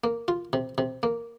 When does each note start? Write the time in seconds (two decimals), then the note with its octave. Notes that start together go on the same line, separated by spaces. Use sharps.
0.04 A#3
0.28 F4
0.53 C3
0.78 C3
1.03 A#3